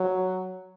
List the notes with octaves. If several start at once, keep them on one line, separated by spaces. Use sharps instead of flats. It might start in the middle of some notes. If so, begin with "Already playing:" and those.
Already playing: F#3